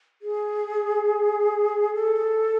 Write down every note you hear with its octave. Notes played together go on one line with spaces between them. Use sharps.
G#4
A4